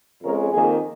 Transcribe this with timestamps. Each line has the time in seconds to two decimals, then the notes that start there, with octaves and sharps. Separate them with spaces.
0.22 F2 C#3 G#3 A#4
0.51 F2 D#3 A#3 G#4